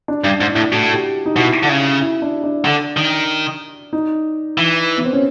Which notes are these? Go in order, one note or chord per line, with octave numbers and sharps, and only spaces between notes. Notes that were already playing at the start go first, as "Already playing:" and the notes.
D4
G2
G#2
A2 E4
A2 F#4
G4
D#4
B2 E4
D3
C#3
E4
D4
D4
D3
D#3
D#4
E3
B3
C4
C#4